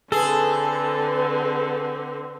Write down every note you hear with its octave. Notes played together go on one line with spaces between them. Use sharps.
D3 C4 G#4 A4 B4